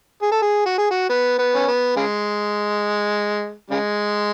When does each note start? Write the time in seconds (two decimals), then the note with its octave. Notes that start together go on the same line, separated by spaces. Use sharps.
0.22 G#4
0.32 A4
0.42 G#4
0.66 F#4
0.78 G#4
0.91 F#4
1.09 B3
1.39 B3
1.55 C#4
1.67 B3
1.96 C#3 G#3
3.70 C#3 G#3